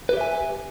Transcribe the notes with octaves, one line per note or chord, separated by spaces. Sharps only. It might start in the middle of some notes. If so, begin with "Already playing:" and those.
G4 B4 E5 G#5